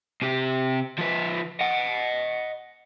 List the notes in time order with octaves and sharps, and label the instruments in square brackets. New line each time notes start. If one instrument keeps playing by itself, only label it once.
[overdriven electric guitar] C3 G4
F3 B4
D#5 F#5